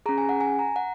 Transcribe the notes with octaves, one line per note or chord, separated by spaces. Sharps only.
C#4 G#4 A#5
G#5
F#5
G#5
A#5
F#5